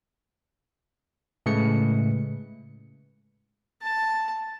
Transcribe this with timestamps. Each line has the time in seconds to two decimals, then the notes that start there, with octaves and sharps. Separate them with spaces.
1.46 A2 C#3 G#3 A3 B4 C#7
3.81 A5